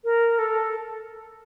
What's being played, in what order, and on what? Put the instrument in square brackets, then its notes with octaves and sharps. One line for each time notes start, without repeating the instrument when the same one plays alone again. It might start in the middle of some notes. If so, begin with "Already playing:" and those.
[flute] A#4
A4